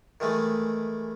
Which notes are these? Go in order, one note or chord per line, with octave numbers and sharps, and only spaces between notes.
D#3 E3 G#3 A3